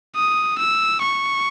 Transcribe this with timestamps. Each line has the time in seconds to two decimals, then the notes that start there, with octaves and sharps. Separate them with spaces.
0.15 D#6
0.58 E6
1.02 C#6